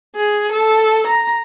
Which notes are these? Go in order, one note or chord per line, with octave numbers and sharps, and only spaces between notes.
G#4
A4
A#5